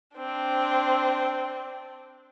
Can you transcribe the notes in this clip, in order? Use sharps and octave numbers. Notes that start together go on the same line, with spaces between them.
C4 D4